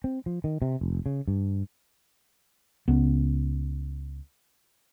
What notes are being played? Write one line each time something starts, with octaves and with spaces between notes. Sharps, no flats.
C4
F3
D#3
C3
F1
C#3
G2
C#2 B3